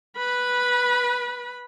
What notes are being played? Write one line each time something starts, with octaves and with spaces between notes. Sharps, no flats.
B4 B5